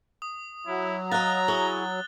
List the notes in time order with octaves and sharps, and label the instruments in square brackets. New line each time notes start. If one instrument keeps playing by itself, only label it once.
[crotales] D#6
[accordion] F#3 [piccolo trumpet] E4
[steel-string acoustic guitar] D#5 F5 [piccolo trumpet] A#5 [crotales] F#6 A6
[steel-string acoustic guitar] E4 G#4 C#5 [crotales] G7